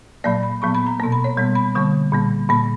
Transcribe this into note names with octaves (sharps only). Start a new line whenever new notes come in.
A#2 F#3 A#3 D5
B5
A#2 F#3 B3 C#6
B5
A#5
B2 A#3 A#5
B5
C#5
B2 G3 B3
B5
D3 G3 A#3 C#6
A#2 G3 A#3
A#2 A#3 B5